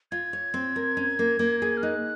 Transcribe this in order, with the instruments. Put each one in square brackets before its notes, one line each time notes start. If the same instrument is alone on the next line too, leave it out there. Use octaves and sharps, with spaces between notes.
[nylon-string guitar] F4 [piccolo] G#6
[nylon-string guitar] C#5
C4
A#4
C#4
A#3
A#3
G#4
[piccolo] F6
[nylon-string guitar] D#4 [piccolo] F#6